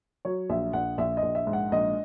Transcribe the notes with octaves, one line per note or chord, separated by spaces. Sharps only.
F#3 C#5
A#1 E5
A#1 F#5
A#1 E5
D#5
A#1
E5
G#2
F#5
A#1 D#5